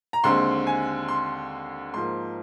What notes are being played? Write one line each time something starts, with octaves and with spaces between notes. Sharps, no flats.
A#5
D#2 D3 G#3 C4 C6
G#5
C6
G#2 F3 A#3 C6